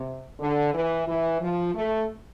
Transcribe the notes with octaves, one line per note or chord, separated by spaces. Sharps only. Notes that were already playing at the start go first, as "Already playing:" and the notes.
Already playing: C3
D3
E3
E3
F3
A3